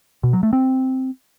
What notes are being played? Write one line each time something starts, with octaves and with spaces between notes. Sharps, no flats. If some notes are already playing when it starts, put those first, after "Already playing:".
B2
F#3
A3
C4